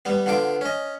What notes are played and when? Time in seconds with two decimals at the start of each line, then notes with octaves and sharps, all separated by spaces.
0.05 G3 B3
0.26 D3 B3 F4 D6
0.61 C#4 D#5